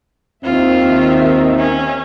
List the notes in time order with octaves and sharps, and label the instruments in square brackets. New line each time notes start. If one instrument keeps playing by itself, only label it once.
[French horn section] D#2 C4 [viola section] D#3 E5 [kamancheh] F4
[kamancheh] C#4